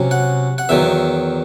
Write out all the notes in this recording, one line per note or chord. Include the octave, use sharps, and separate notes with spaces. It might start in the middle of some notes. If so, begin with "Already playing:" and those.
Already playing: C3 F#3 C#4
F#5
F#5
E2 D#3 F#3 E5